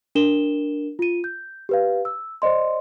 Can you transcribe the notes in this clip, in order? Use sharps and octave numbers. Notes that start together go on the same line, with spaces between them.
D4 A#4 E7 G7
F4 D#7
G6
G4 B4 F5
E6
C5 D5 D#5 C6